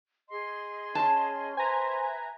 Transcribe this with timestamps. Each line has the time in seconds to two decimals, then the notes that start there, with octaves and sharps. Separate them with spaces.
0.30 G#4 D#5 C6
0.95 C#4 A5
1.57 B4 C5 E5 G#5 A#5